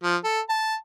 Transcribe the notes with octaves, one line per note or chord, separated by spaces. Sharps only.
F3
A4
A5